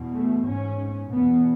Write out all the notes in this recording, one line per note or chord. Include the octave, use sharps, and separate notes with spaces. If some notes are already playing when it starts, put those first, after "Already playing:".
Already playing: E2 B2
A3
G#2 C#4
E2 B2 B3